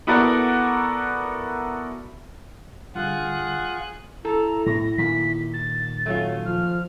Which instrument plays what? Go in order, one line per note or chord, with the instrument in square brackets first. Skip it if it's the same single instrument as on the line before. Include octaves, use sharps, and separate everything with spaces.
[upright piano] B3 E4 F#4 A4 A#4 D5
[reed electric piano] G2 D3 G3 [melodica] F4 F#5 [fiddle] G#4 F#6
[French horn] E4 [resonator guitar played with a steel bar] A4 [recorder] A#5
[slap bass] A2 [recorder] A#6
[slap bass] A#2 D#3 A#3 [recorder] B6
[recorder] A6
[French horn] F#3 [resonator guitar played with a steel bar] A3 C#4 F4
[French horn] F3 [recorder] F6